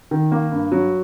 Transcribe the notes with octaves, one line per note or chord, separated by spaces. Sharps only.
D#3
A#3
G2
F#3